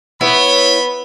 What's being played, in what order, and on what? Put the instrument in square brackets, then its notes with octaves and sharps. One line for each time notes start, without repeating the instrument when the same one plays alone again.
[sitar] B3 [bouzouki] E4 C#5 [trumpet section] B5